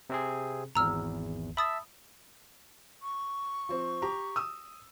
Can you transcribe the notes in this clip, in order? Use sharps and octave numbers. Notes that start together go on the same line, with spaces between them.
C3 C4 G#4
G#1 E2 A#5 E6 F6
E5 A5 B5 D#6 E6 A6
C#6
F3 C4
G4 A#5
D#6 E6